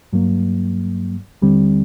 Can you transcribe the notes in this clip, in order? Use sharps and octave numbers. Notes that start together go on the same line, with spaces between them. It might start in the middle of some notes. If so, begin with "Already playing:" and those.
G2 F#3 A#3
D#2 D3 G3 C4